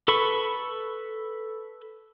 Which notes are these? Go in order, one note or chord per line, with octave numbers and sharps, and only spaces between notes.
A4 B4 B5 C#6